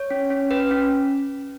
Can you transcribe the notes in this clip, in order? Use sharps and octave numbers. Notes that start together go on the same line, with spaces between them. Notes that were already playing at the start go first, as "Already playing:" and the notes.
Already playing: C#5
C#4
C#4
C#4 B4
C#4